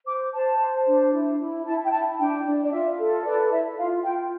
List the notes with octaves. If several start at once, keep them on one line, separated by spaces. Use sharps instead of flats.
C5 D6
C5 A5
C5
D4
E4
E4
E4 A5
G5
E4 A5
D4 G5
D4
D5
F4 E5
A4
B4 D5
E4 E5
F4 F5
F4 G5